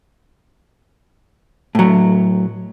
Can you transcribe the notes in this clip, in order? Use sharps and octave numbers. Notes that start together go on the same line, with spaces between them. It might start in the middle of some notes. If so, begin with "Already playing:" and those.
A2 F#3